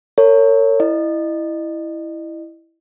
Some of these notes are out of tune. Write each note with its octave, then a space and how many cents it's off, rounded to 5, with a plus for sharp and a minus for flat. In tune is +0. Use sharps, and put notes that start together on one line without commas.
A#4 -45 C#5 +0
E4 +0 D#5 -35